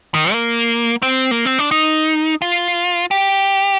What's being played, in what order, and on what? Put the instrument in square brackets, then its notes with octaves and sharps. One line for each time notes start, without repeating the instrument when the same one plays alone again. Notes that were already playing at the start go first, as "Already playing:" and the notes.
[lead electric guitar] D#3
A#3
C4
A#3
C4
D4
D#4
F4
G4